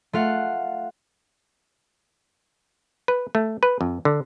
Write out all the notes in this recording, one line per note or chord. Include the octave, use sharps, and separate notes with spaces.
A3 F4 F5 F#5
B4
A3
B4
F2
D3